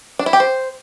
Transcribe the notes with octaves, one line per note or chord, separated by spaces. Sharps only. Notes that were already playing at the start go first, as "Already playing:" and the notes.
D4
E4
G4
C5